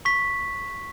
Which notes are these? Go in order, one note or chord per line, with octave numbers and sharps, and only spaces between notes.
C#6 B6